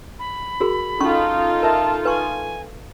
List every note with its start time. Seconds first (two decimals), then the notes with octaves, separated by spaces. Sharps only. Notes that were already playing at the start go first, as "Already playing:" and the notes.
0.19 B5
0.60 F#4 G#4 A#4
1.00 C#4 D#4 F4 A4 C#6
1.63 A#4 E5 A5
2.05 B4 G#5 C#6